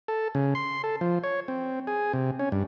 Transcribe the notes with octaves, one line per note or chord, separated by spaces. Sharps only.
A4
C#3
C6
A4
F3
C#5
C4
G#4
C3
C#4
G2